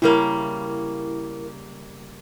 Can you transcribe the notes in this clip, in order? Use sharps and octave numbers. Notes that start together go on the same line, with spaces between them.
C#3 G3 A#3 E4 A#4